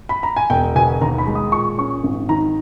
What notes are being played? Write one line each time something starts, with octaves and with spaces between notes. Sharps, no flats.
B5
A#5
G#5
E1 G5
B2 G#5
D#2 A#5
B5
G#3
D#6
A#2 C#6
C#4 C#6
G#1
D#3 A#5